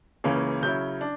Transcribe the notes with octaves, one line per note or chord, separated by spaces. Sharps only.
C#2 C#3 E3 A#3 C#4
C#3 F#3 C#4 E4 G6
D4